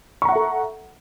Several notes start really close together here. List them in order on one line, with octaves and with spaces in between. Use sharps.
C#6 A#5 F#5 E5 A4